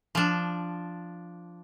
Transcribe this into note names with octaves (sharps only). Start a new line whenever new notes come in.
F3 D4